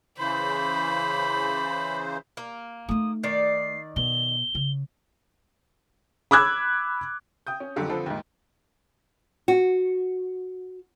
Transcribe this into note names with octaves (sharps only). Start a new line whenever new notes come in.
C#3 E3 C5 B5
A#3
A3 D#4 D#6
D#3 D5 C7
B2 G7
C#3
B5 D6 E6 F#6 G#6
G5 D#6 G6
C#4
F2 D3 F#3 G3
D3 F3 C4 A4 B4
D#2 G#2
F#4